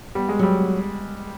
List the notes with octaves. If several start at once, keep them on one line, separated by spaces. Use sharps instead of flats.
G3 B3
G#3
F#3 G3